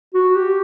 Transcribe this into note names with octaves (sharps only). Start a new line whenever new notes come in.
F#4
G4